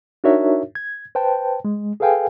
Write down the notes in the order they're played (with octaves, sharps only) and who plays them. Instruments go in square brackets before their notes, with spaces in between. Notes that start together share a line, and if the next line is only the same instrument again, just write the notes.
[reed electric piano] D4 D#4 F#4 A#4 C#5 E5
G#6
B4 C5 G5 A5
G#3
G#4 A4 B4 F5 G5 G#5